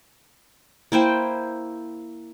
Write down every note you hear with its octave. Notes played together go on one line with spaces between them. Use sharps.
A#3 E4 C5 G5